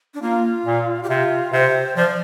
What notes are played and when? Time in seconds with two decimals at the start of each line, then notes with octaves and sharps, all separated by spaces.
0.14 D4
0.22 A#3 F4
0.66 A#2
1.03 G4
1.10 C3 F4
1.53 C3 C5
1.96 F3 D5